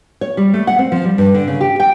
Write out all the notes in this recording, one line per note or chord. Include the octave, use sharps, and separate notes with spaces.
C#5
G3
A3
F#5
C4
F3
G3
G2
D3
C#3
G4
G5